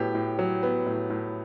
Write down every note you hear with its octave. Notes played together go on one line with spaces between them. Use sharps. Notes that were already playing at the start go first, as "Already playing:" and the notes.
Already playing: A2 F#3 B3 G4
A2
F#3
B3
A2
A2